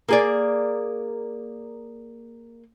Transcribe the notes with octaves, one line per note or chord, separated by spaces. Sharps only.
A#3 G#4 D5